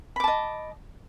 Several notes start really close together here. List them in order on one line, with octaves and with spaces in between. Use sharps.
B5 D6 A5 D#5